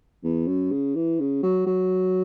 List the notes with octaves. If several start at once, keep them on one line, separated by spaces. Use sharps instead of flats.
E2
F#2
C#3
E3
C#3
F#3
F#3